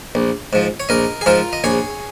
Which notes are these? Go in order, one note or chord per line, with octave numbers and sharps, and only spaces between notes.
A#1
G#2 F3
C#5
A#1 A#4 D#5
G#4
G#2 F3 F4 A#4
D#5
A#1 G#4 C#5